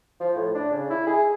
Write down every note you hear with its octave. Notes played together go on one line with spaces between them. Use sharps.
F3
A2
D4
C#3
E4
G#4